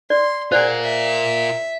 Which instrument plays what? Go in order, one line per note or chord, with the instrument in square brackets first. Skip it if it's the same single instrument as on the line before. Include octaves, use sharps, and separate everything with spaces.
[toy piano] D5 [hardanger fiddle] C6
[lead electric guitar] F4 A#4 [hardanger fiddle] G#4 [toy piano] C5 D5 F#5
[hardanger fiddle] E5